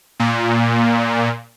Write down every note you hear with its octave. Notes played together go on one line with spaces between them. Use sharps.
A#2